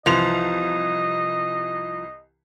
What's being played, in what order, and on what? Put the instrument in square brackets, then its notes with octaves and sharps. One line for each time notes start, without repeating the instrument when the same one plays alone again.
[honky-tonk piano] C2 E3 F7 [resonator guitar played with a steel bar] F3 [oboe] D#5